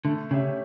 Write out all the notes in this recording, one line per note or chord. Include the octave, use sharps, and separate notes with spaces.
D3 A3
C#3 C#4 G4 C#5 E5